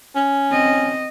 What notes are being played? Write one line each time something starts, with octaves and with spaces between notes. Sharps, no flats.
C#4
C4 D#5